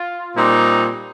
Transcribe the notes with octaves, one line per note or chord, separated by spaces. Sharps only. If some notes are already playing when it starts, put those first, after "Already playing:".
Already playing: F4
A#2 G3 C4 D#4